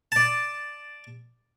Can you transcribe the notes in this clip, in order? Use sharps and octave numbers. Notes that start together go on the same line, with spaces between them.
D5 A5